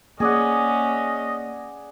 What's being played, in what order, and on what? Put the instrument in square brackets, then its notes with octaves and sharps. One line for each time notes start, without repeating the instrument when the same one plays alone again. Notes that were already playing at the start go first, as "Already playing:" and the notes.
[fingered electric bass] A#3 [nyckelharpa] C#4 [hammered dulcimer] G#4 D5 F#5 [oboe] D#5